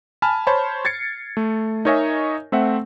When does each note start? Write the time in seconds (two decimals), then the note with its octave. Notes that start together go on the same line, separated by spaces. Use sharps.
0.22 G#5 A5 B5 F6
0.47 C5 C#5 A5 B5
0.85 G#6 A6 C7 C#7
1.37 A3
1.85 D#4 A#4 C#5 D#5 E5 G#5
2.52 A3 C4 E5 F#5